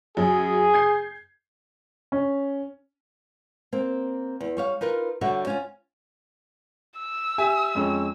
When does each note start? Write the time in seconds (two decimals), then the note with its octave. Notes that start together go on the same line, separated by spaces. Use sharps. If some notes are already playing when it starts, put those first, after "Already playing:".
0.17 F#2 F#3 G#4
0.74 G6 G#6 C7
2.12 C#4
3.73 A#3 C4
4.41 E2
4.57 G3 C#5 F5
4.81 D#4 F4 A#4 B4
5.21 D3 G3 F#4 C#5 E5
5.47 C#4 F4
6.99 E6
7.38 G4 E5 G#5
7.75 F2 G#3 C#4